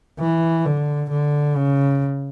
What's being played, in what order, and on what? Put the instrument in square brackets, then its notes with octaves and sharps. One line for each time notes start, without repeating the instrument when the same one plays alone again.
[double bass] E3
D3
D3
C#3